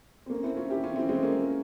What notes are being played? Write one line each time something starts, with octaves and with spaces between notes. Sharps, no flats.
C4
A#3 C#4
C4 E4
C#4 F4
E4 G4
C#4 F4
C4 E4
G#3 C4
A#3 C#4